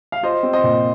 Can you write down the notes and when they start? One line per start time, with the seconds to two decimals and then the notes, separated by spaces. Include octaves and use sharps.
0.12 F5
0.23 F4 C5 D#5
0.43 C4
0.53 C5 D#5
0.64 A#2